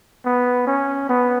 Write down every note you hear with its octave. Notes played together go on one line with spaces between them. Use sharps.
B3
C#4
B3